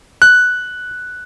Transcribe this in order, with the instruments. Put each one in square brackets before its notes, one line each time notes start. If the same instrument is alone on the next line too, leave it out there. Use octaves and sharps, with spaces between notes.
[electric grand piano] F#6